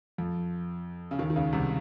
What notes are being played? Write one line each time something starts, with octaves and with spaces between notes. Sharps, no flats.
F2 F3
C#3
D#2 D#3
D#3
C#2 C#3
C2 C3